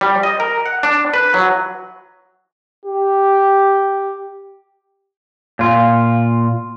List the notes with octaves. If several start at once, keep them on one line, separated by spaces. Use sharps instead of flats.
G3
D#5
A#4
F#5
D4
B4
F#3
G4
A#2 F4